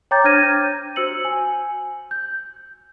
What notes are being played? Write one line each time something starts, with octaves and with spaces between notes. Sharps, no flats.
C#5 G5 A#5 D6 G6 A6
D4 C5 F6 G#6 A#6 D#7
G6
F#4 C5 E6 C#7 F#7
G#5
G6